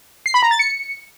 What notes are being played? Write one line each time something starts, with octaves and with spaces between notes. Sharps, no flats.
C7
B5
A#5
A6
C#7